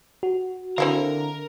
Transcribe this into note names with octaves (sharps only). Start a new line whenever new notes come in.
F#4
D3 C4 E4 A#4 F5